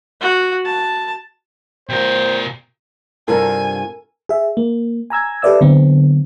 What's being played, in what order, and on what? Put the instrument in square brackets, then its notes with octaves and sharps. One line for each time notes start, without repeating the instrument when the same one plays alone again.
[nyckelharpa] F#4
A5
[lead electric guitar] B2 A#4 [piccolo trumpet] C5 [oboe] G5
[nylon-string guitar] G2 C3 F4 [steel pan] A4 A#4 [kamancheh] G#5
[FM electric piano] G#4 E5
A#3
G#5 A#5 E6 G#6
G4 A4 B4 D5 E5 E6
D3 F#3 B3 C4